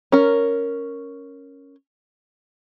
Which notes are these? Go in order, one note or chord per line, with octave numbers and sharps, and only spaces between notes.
C#4 A#4